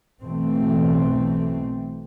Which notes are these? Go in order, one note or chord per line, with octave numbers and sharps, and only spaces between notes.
B1 B2 E3 A3 C4